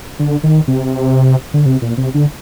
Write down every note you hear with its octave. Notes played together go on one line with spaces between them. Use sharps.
D3
D#3
C3
D3
C3
A#2
C3
D3